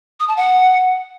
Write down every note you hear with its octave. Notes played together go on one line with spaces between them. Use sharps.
D#6
A5
F#5